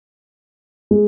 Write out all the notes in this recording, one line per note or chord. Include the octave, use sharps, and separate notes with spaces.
G#3